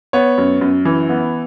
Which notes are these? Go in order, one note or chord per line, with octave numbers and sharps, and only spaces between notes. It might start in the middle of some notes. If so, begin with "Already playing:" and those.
B3 C#5
F#2
F#2
E3
B3